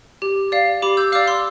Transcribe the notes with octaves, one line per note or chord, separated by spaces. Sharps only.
G4
D5 F5
G4 B5 D6
E6 G6
D5 F5 D6 F6
C6 E6